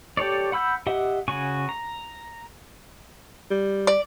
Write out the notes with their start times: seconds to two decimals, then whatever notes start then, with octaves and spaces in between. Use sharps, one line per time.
0.17 G4 A4 C#5 D5
0.52 F#5 B5 E6 G6
0.87 G4 D#5 E5 F#5
1.28 C#3 F#4 G#5 C#6
1.69 A#5
3.51 G3
3.87 D5